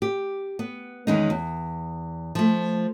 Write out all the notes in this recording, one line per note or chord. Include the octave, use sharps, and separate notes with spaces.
G4
B3
E2 D#3 E3 G#3 C#4 D#4
E2
F3 A3